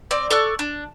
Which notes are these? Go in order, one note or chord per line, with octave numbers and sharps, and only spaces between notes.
C4 D5
A4 D5 C#6 F#6
D4